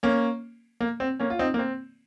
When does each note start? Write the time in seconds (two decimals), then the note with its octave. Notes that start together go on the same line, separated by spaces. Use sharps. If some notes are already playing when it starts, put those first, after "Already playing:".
0.03 A#3 C#4
0.80 A#3
1.00 C4
1.20 A#3 C#4
1.30 F4
1.39 C4 D#4
1.54 A#3
1.59 C4